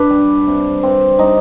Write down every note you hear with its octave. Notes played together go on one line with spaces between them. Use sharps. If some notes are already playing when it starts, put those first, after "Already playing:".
Already playing: D4 B4
G3
C3
C3 C4
G3 D#4